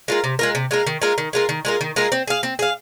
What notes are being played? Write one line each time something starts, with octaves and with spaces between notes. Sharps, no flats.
G#3 F4 A#4
C3
G#3 F4 A#4
C3
G#3 F4 A#4
D#3
G#3 F4 A#4
D#3
G#3 F4 A#4
D#3
G#3 F4 A#4
D#3
G#3 F4 A#4
C4
G#4 F5
C4
G#4 F5